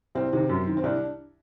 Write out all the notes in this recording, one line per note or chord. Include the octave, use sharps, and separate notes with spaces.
C2 C4
C3 D#3
F#2
D#3
C4
C2 D4